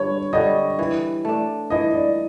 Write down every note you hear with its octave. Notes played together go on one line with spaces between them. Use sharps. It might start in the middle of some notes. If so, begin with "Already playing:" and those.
Already playing: G2 D3 C#5
D3 G3 D#5
E3
A3 D4
E3 D#5
D5